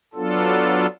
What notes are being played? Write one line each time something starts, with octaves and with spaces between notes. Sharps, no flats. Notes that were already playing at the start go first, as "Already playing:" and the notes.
F#3 B3 D4 F4 A4